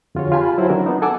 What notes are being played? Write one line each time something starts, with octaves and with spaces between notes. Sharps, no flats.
F2 D3 F4 F#4 G#4 C#5
F4 G4 G#5 A5 B5
F#3 G3 E4 F#4 C5 C#5
D#3 F#3 C#4 D4 F4 A#4
B3 D4 D#4
A4 F#5 G#5 A5 D6 E6